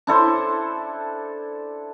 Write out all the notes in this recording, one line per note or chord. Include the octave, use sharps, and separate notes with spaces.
D4 E4 A4 C5